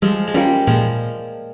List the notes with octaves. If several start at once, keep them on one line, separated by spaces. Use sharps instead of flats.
F3 G3 G#3
G#3
G3 A#3 C#4 F4
A#2 F3 G#3